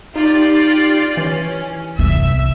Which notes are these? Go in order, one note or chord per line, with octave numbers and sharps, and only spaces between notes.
D#4 F4 G4 D5
E3 C#4
C2 B3 E5